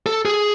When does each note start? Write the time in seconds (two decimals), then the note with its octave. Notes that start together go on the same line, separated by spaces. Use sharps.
0.06 A4
0.25 G#4